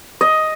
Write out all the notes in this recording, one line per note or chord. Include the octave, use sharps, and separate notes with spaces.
D#5